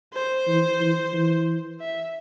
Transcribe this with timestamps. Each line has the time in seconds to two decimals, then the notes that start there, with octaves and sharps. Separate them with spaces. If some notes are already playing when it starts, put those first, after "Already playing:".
0.14 C5
0.47 E3
0.80 E3
1.14 E3
1.80 E5